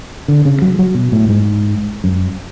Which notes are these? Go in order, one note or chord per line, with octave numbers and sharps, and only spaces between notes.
D3
C#3
F#3
F#3
B2
A2
G#2
F#2